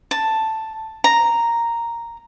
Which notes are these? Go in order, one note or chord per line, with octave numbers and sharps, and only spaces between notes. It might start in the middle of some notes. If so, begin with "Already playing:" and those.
A5
A#5